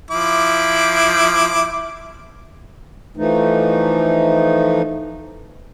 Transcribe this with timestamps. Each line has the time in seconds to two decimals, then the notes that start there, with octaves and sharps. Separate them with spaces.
0.11 F3 E4 D6
3.17 E3 F3 A3 D#4